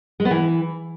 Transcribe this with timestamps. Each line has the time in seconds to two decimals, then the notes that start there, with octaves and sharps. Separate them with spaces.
0.20 G#3
0.25 B3
0.31 E3